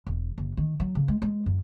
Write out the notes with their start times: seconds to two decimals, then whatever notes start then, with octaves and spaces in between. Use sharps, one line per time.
0.07 E1
0.38 F#1
0.57 D#3
0.80 F#3
0.95 C#3
1.08 G#3
1.22 G#3
1.46 F#2